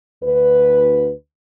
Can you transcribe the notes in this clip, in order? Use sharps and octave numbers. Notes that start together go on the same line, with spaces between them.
D2 B4